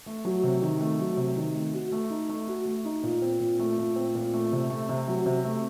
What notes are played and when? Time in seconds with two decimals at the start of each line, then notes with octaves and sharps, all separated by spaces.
0.06 A3
0.25 F#3
0.43 C3
0.62 D#3
0.80 A3
0.99 F#3
1.17 C3
1.36 D#3
1.54 A3
1.73 F#4
1.92 A3
2.10 D#4
2.29 A3
2.47 F#4
2.65 A3
2.85 D#4
3.03 A#2
3.22 C4
3.40 A#2
3.59 A3
3.78 A#2
3.96 C4
4.15 A#2
4.33 A3
4.52 C3
4.70 A3
4.89 C3
5.08 F#3
5.26 C3
5.45 A3